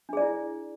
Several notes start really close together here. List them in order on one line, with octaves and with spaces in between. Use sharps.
D4 G#4 D5 E4